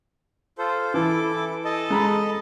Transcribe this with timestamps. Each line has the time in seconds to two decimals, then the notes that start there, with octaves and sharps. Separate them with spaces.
0.58 F4 A4 C5
0.94 E3 E4 A4 D6
1.65 A4 D#5 A5
1.90 G#3 A#5 B5